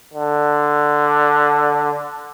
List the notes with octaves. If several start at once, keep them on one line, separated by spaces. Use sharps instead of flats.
D3